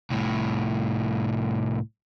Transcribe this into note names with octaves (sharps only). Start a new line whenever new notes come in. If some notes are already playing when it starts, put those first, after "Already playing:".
C2 A2